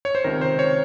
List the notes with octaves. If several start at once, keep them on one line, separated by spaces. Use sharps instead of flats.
C#5
C5
C#2 C3 D#3 A#4
C5
C#5